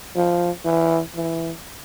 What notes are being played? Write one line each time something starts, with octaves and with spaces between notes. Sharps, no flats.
F3
E3
E3